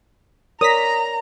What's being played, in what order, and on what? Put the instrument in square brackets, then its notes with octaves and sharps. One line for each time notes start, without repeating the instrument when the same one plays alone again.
[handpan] A#4 C#5 D5 [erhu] A#5 [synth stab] D#6 A#6 B6